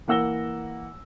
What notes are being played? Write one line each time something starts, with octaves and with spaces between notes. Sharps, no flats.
E3 A#3 F#5 E6 A#6 G7